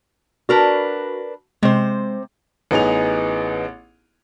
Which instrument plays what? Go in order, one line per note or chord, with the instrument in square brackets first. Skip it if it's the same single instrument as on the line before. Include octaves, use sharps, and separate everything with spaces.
[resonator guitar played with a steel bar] D4 A#4 B4 [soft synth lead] F#4
[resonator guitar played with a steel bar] C3 C5 [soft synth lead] G#3
[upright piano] A1 B3 D#4 G#4 F7